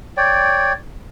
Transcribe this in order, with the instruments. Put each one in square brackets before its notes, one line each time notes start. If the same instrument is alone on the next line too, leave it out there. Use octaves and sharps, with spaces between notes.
[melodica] C#5 D5 G5